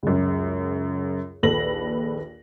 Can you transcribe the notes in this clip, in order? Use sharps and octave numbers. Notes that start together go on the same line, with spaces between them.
C#2 F#2
A#1 D#2 A4 B4 A#6 F#7